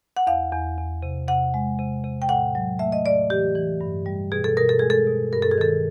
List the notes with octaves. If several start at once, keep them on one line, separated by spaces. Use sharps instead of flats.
F#5
E2 F5
E2
E2
C3
C3 F#5
G#3
C3
C3
G5
A2 F#5
F#3
A3 E5
D#5
A2 D5
E3 G4
E3
G2
G3
B2 G#4
A4
B2 A#4
A4
G#3 G#4
A4
B2
G2 A#4
A4
G#4
D#3 A4